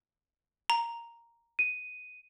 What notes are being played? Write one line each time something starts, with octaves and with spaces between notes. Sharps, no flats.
A#5
D#7